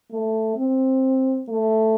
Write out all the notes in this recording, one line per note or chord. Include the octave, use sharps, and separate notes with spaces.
A3
C4
A3